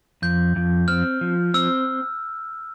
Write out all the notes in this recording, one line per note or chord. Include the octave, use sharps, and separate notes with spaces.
F2 G6
F2
C4 F6
F3
C4 E6